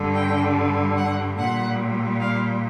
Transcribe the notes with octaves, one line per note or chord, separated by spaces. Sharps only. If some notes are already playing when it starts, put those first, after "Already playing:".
Already playing: G2 D3 G3
G5
F#5
A#2 G3 F#5
F5